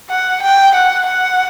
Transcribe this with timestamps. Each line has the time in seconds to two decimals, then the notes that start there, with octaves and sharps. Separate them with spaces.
0.10 F#5
0.43 G5
0.75 F#5
1.07 F#5